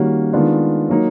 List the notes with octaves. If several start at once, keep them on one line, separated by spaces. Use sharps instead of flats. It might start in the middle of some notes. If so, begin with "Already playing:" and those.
Already playing: D#3 G3 A#3 C#4 F#4
D#3 G#3 B3 D4 F4
F#3 A#3 D#4